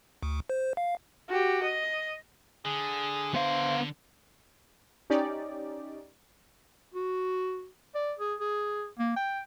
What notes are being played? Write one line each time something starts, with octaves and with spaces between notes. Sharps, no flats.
D2
C5
F5
F#4 G4
D#5
D3 G#4
B3 C5 F5
C#4 D#4 G4 D5
F#4
D5
G#4
G#4
A#3
G5